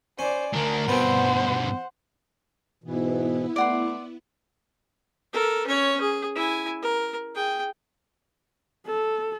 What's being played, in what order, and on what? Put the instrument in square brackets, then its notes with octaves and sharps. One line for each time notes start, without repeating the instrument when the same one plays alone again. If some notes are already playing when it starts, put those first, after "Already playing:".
[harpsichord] C#4 [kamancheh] C5 D5
[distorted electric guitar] D2 D4 [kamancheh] A#4
[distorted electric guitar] G2 B2 [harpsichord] B3 C4 [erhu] C5 [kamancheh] F#5
[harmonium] G#2 B2 E3 [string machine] B3 E4
[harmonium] A3 [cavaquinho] D5 F#5 C6
[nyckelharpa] A4 A#4
C#4 C#5
G#4
E4 G#5
A#4
G#4 G5
[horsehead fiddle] A4